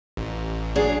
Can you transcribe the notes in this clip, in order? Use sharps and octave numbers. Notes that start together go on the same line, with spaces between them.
A1
F#3 D4 G#4